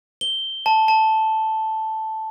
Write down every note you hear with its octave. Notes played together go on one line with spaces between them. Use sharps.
G7
A5
A5